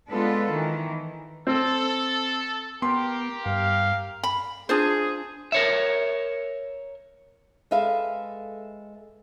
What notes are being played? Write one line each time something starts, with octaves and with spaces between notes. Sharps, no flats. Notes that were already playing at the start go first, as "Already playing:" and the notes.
G#3 B3 D4 F4 A4 B4
D#3 E3
C4 A4
B3 G4 A#4 C6
G2 F5
B5
D4 F4 G#4 C5
A#4 C#5 E5
G#3 A4 B4 E5 F5